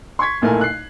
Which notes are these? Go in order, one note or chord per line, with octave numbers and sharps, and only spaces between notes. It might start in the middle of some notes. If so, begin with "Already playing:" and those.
C6 C#6 G#6 B6
B1 A#2 A3 E4 A#4 G#5
F#6 C7